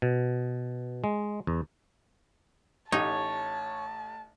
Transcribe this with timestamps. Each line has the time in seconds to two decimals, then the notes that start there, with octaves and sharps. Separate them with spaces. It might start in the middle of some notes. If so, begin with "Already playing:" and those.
0.02 B2
1.04 G#3
1.47 E2
2.92 A1 D#4 G4 C#5 A5